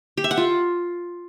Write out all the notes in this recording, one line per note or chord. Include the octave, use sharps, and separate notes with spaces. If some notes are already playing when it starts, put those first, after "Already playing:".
G4
E5
F#5
F4